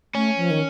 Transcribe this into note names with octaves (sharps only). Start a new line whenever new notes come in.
A3 C#4
F3
D#3